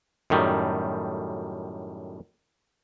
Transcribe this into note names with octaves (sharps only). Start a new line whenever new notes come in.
F#2 A2 D#3 G3